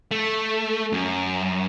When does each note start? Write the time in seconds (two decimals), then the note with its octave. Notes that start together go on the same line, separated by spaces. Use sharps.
0.11 A3
0.92 F#2